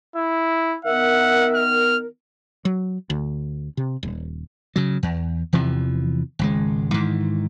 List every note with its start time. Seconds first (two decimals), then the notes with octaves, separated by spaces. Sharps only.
0.16 E4
0.85 D#3 B3 A#4 E5 F#5
1.55 F6
2.65 F#3
3.10 D2
3.77 C3
4.03 D#1
4.76 C#3 F#3
5.03 E2
5.53 E2 C3 E3 F3
6.39 G#1 C#2 G#3
6.94 G#2 D#3 E3